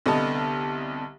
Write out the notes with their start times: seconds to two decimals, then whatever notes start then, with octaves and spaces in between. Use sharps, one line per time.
0.06 C2 D3 B3 D#5 A5